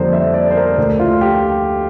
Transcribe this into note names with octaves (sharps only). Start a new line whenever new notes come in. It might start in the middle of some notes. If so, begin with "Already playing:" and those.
Already playing: F2 D3 G3 A#3 C5
E5
D5
C5
A#4
D2 D3 A3
F4
G4